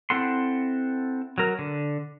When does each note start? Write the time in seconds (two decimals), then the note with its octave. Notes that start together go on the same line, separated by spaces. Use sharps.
0.10 C4 E4 A4 F#5 C6
1.38 F#3 A#4
1.59 D3